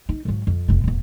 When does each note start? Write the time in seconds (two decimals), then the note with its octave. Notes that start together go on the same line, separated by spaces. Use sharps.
0.09 D#4
0.25 G#2 F#3
0.47 F2
0.68 F1 C3
0.84 D#1 E2